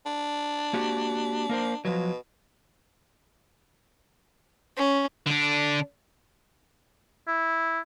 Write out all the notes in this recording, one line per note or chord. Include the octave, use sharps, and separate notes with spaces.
D4
A#3 F#4 G4
A#3 A#4 C5
B2 F3 F#3
C#4
D3 D4
E4